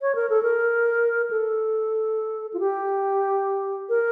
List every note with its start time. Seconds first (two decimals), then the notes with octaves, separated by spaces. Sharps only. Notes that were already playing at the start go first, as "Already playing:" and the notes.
0.01 C#5
0.15 A#4
0.30 A4
0.43 A#4
1.30 A4
2.53 F4
2.60 G4
3.89 A#4